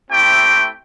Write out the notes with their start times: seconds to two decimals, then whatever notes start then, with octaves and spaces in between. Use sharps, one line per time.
0.10 A3 C4 E4 G4 G5